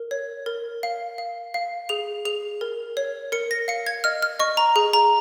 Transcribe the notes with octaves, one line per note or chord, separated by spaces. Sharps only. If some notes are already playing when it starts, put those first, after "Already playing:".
Already playing: A#4
C#5
A#4
F5
F5
F5
G#4 F7
G#4 F7
A#4
C#5
A#4 C#7
A#6
F5 C#7
G#6
D#5 F6
F6
D#5 C#6
A#5
G#4
A#5